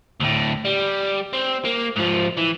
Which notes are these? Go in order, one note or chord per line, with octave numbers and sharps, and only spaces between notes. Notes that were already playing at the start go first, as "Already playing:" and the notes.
D2 A2
G3
C4
A#3
G#2 F3
E3